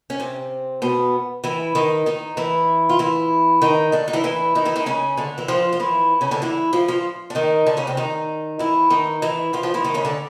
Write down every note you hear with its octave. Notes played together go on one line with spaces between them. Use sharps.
C#4
C3 C4
B2 B3
E3 E4
D#3 D#4
D#3 D#4
E3 E4
F4
E3 E4
D#3 D#4
D3 D4
D#4
E3 E4
E3 E4
D#3 D#4
E3 E4
D#3 D#4
C#3 C#4
D3 D4
E3 E4
F3 F4
F4
E3 E4
C#3 C#4
D3 D4
E3 E4
F3 F4
F3 F4
D4
D#3 D#4
D3 D4
C#3 C#4
C3 C4
D#3 D#4
E3 E4
D#3 D#4
E3 E4
F3 F4
F3 F4
E3 E4
D#3 D#4
C#3 C#4
D3 D4